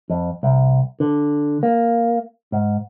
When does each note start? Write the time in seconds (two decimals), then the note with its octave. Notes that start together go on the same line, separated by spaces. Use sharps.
0.10 F2
0.43 C2
1.00 D3
1.63 A#3
2.52 G#2